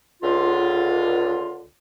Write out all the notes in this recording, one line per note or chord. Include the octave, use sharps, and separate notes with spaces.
C#2 D3 F4